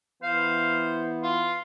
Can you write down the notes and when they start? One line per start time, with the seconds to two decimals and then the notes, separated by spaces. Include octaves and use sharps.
0.23 E3 B3 C5 F5
1.23 F4 C6